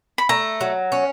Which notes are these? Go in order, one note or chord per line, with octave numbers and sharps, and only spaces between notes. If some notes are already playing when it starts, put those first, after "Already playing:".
B5
A3 A#5
F#3
C#4